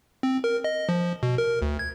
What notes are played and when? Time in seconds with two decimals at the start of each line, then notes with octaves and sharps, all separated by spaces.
0.23 C4
0.44 A#4
0.64 D#5
0.89 F3
1.23 B2
1.38 A#4
1.62 D2
1.79 G#6